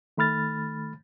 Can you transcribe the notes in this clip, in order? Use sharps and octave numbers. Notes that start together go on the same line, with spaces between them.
D#3 A3 B5 F6 A6